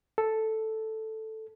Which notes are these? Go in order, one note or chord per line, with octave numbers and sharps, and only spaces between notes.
A4